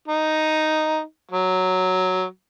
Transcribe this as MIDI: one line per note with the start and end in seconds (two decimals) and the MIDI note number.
0.08 1.02 63
1.31 2.26 54